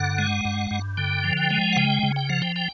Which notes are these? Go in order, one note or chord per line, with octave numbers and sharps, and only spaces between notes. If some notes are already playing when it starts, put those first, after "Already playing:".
Already playing: G2 D3 F#5
G#3
G2
G2
D3 G5
F3
G5
G#3
F#5
C#3 G5
C#3
G5
F3 F#5
G5
G5